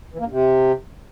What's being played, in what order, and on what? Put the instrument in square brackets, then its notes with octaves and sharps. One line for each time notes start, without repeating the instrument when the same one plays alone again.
[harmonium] E3
A#3
G2
C3